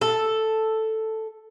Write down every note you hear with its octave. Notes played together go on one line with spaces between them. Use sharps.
A4